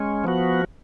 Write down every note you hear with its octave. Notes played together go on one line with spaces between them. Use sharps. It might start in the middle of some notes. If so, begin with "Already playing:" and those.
Already playing: G#3 C#4
F3 B3 F#4